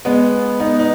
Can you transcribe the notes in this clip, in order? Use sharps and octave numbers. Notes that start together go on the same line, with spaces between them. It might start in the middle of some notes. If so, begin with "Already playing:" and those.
G#3 B3
B3 D#4
D#4